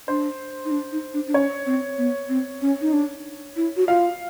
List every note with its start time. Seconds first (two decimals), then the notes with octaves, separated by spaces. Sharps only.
0.08 D4 C5
0.65 D#4
0.71 D4
0.92 D#4
1.14 D4
1.27 D4
1.34 C#4 C#5
1.66 C4
1.98 B3
2.29 C4
2.62 C#4
2.81 D#4
2.93 D4
3.56 E4
3.77 F#4
3.88 F4 F5